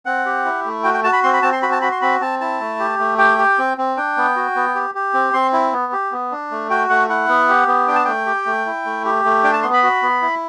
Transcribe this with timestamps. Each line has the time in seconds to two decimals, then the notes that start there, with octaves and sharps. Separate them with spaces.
0.06 C4 F#5
0.26 G4
0.45 E4
0.65 A3
0.84 F#4 G5
0.94 G5
1.04 F#4 A5
1.13 B5
1.23 C4 C6
1.33 B5
1.42 C4 A5
1.53 C6
1.63 F#4 B5
1.72 A5
1.82 F#4 B5
1.92 C6
2.01 C4 B5
2.21 C4 A5
2.40 E4 A5
2.61 A3
2.79 G4
2.99 A3
3.18 G4 G5
3.38 G4
3.58 C4
3.78 C4
3.97 D4 G5
4.17 B3
4.36 F#4
4.56 B3
4.75 G4
4.95 G4
5.14 C4
5.33 C4 C6
5.53 E4
5.73 B3
5.93 G4
6.12 B3
6.32 D4
6.51 A3
6.70 F#4 G5
6.90 A3 F#5
7.09 E4 F#5
7.29 B3
7.49 G4
7.67 B3
7.87 D4 G5
7.95 A5
8.05 A3 G5
8.26 G4
8.46 A3
8.66 E4
8.85 A3
9.05 G4
9.25 A3
9.44 D4 G5
9.53 A5
9.63 B3 C6
9.73 B5
9.83 F#4
10.02 B3
10.22 E4